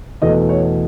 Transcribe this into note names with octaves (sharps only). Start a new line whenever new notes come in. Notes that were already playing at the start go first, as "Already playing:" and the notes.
E2 B2 A3 D#5
C#5